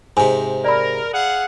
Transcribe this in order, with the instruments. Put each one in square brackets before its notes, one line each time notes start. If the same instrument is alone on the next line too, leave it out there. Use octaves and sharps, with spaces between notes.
[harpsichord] G#2 C3 [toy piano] G#5
[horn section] A#4 [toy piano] D5 B5
[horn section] G#4 F5 F#5